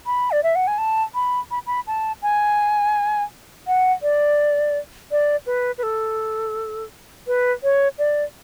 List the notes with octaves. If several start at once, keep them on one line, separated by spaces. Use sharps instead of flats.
B5
D5
E5
F#5
G#5
A5
B5
B5
B5
A5
G#5
F#5
D5
D5
B4
B4
A4
B4
C#5
D5